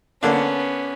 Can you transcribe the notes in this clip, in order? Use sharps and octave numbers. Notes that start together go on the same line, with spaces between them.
D3 A#3 B3 C#4 D4